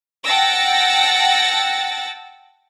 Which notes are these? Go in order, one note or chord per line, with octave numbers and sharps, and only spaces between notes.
F#5 G5 A5 E6 A6 A#6